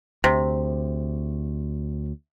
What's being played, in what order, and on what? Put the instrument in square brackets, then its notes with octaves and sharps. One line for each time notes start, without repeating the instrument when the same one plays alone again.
[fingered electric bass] D2 [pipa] C3